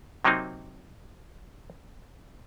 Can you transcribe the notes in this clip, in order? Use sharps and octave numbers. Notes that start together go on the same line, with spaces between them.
C3 F#3 A#3 C4 D#4